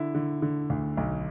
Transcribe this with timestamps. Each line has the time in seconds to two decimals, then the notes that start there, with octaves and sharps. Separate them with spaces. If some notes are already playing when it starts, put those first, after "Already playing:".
Already playing: D3 E4
0.14 D3
0.42 D3
0.70 D2
0.97 B1